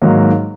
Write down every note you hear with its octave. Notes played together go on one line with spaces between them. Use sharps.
G#2 D#3 F#3 A#3